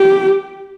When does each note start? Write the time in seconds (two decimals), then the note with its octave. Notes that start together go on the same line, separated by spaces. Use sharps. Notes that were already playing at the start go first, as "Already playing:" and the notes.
Already playing: G4